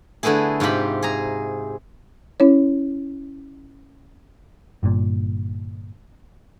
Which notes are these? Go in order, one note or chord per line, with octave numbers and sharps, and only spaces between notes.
D3 A3 B3 E4 G#4
G#2 C3 F4 G4 B5
G#4 A#5
C#4 E4 C#5
G1 G2 A#2